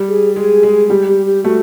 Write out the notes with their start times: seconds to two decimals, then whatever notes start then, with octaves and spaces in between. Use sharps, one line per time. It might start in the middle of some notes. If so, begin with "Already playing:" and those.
Already playing: G3
0.08 G#4
0.35 G#3 G#4
0.63 G#3
0.90 G3 G4
1.08 G4
1.26 G4
1.44 A3 F#4